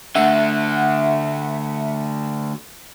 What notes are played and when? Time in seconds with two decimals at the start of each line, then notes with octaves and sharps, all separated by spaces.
0.15 D2 D3 E5 F#5